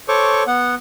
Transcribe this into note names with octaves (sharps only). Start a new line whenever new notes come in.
A4 C5 C#5 C#6 D6
B3 F#5